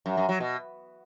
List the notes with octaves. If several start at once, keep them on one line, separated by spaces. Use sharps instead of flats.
F#2
F#2
F#3
B2